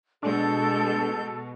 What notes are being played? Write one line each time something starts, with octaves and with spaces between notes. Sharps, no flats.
B2 G#3 D4 A4 G6